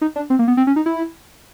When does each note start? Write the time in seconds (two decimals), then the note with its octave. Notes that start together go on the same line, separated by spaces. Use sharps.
0.01 D#4
0.16 D4
0.30 C4
0.39 A#3
0.48 B3
0.57 C4
0.67 C#4
0.76 D#4
0.86 E4